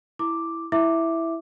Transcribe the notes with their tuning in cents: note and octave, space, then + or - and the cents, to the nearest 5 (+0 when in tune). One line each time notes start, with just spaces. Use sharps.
E4 +0 D6 +0
E4 +0 E5 +0 D6 +0